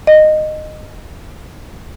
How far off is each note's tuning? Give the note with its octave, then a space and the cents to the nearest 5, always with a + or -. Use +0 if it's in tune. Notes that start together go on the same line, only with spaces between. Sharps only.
D#5 -15